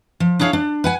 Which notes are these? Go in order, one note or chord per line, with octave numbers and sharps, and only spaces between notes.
F3
D4 E4 G#4 C#5 F5
D4
B4 F#5 G#5